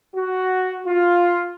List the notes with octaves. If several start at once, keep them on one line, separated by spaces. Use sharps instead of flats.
F#4
F4